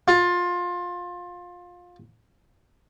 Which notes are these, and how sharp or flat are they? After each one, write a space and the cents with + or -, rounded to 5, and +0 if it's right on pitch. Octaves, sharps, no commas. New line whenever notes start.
F4 +20